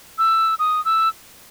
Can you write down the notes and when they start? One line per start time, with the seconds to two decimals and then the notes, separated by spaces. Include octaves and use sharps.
0.18 E6
0.59 D#6
0.85 E6